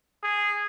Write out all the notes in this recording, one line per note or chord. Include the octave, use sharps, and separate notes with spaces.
G#4